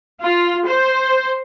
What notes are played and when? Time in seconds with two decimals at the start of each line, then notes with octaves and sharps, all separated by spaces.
0.22 F4
0.67 C5